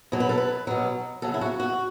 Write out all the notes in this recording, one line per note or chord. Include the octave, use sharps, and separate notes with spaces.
B2 F#3
B4
A4
B4
B2 F#3
C#3 F#3 A4
E4
F#4
F#4